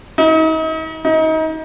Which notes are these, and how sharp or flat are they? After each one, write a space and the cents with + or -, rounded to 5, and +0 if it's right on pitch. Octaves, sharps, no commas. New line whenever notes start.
D#4 +40
D#4 +30